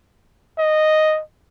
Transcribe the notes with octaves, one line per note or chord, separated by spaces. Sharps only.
D#5